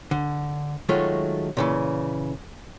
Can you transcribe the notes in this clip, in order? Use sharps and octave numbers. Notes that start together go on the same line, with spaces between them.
D3
D#3 F#3 G#3 A3 F4
A#2 C#3 E3